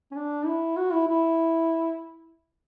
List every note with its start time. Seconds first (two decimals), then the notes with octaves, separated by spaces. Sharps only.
0.11 C#4
0.16 D4
0.46 E4
0.77 F#4
0.92 E4
1.08 E4